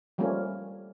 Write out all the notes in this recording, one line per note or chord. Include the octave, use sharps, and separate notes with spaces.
F3 G3 A3 A#3 C#4